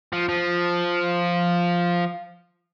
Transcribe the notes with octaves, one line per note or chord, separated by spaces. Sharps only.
F3
F3